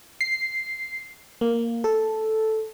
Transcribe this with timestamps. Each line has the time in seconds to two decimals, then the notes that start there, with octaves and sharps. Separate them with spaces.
0.21 C7
1.41 A#3
1.84 A4